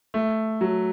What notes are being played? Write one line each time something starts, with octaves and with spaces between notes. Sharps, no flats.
A3
F#3